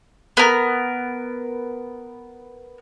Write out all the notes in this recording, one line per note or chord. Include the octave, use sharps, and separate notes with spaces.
B3 A#4